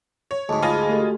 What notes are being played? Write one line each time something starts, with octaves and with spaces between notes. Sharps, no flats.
C#5
D2 G#2 G#3 G#4 A5
F4 D#5 G#5 B5
A3 G4 A4
F#4